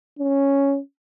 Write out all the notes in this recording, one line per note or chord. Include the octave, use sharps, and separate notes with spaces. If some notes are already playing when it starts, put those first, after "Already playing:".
C#4